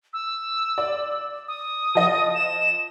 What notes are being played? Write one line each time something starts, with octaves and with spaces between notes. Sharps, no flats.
E6
D5
D#6
F3 D#5
E7